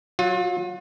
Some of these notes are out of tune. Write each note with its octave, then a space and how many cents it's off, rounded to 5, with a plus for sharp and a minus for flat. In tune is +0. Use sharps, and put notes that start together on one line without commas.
F#3 +0 F4 +35